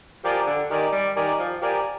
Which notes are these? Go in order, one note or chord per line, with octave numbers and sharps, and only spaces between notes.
F3 G4 A#4 D5 G#5
D3
D#3 G4 A#4 D5 G#5
G3
D#3 G4 A#4 D5 G#5
F3
F3 G4 A#4 D5 G#5